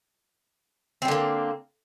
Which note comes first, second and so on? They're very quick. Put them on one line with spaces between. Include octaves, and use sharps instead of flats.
C4 G3 D3 A#3